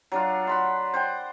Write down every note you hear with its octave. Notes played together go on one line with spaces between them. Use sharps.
F#3 D4 F4
F#5 B5 C6
C5 F#5 G5